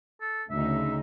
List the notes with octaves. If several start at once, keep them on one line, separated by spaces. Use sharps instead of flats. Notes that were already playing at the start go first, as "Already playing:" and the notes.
A4
D2 C#3 D#4 E5